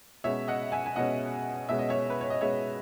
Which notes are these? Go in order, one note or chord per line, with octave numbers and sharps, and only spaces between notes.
B2 G#3 C#4 C#5 E5
D#5 F#5
E5 G#5
G#5
B2 G#3 C#4 D#5 F#5
B2 G#3 C#4 E5
D#5
C#5 E5
B4
C#5
D#5
B2 G#3 C#4 C#5 E5